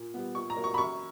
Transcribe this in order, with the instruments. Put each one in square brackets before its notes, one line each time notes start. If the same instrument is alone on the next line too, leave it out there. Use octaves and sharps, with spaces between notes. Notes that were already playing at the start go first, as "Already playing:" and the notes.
Already playing: [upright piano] A#2
G3 B3
A#2 C#6
A#5
F#3 A#3
C#6
B5
F#2 C#6